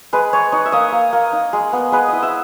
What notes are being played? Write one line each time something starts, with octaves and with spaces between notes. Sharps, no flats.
G#3 B4
G#3 C#5
D#4 C#5
E5
A#3 D#5
A#3
A#3
D#4
G#3
B3
G#3 B4
E4 D#5
E5